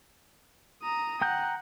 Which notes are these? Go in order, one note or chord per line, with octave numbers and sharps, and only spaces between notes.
A#5 D#6
F#5 G5 A#5 G6